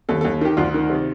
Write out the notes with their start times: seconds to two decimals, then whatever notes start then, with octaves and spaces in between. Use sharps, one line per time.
0.09 D#2 A4
0.21 D#2 A4
0.41 D#3 G4
0.57 D2 F4
0.74 D#3
0.90 C3